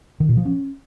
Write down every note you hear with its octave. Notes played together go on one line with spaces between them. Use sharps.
D#3
A#2
F3
C#4